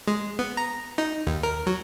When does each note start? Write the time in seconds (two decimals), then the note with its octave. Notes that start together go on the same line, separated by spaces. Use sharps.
0.07 G#3
0.39 B3
0.57 A#5
0.98 D#4
1.27 D#2
1.43 A#4
1.67 F#3